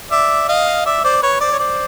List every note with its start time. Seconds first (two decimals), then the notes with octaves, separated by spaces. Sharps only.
0.11 D5 E5
0.48 D#5 F5
0.86 D5 E5
1.04 C5 D5
1.22 B4 C#5
1.40 C5 D5
1.52 C#5
1.59 C5 D5